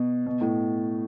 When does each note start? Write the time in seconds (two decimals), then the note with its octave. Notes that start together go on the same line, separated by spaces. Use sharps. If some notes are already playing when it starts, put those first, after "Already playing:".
Already playing: B2
0.26 B2
0.41 A2